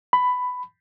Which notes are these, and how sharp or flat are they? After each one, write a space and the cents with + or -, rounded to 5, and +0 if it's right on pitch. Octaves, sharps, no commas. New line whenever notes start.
B5 +15